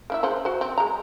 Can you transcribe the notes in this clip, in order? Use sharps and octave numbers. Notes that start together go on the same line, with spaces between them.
A#3 E4 E5
C#3 C5 F#5
F#4 C5
C4
G#3 A#5